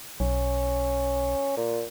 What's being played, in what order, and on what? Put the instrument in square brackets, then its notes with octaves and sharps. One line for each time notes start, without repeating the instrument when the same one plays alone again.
[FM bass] B1 [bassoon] C#4
[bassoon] A#2